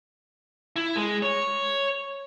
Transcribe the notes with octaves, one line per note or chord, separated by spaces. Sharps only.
E4
G#3
C#5